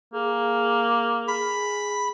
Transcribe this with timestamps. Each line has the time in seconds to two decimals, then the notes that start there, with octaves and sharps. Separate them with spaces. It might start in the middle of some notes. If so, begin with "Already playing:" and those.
0.14 A#3 G#4
1.28 G#4 B5